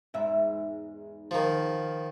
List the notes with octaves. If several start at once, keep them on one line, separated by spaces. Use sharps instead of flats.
E2 G#2 E5
D#3 F3